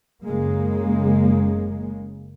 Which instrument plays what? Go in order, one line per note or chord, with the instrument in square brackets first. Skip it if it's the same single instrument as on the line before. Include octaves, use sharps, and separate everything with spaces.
[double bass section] F#1 C#3 G#3 A#3